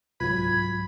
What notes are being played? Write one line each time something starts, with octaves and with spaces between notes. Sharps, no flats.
C2 G#2 F#3 F4 B5 G#6